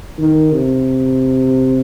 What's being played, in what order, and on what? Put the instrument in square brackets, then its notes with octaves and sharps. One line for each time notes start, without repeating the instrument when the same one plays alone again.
[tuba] D#3
C3